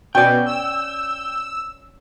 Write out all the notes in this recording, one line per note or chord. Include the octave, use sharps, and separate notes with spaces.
B2 C#4 D5 G5
E6